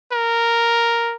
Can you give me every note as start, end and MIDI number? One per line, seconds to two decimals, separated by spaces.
0.12 1.16 70